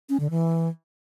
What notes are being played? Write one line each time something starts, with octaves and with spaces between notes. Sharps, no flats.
C#4
D3
E3